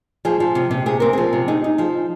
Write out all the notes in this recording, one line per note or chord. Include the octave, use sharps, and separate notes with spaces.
F3 G#4
F3
C3
C3
C3 G#4
C4 A#4
F3 G#4
C3
D#4 G#4
D#4
F3 G#4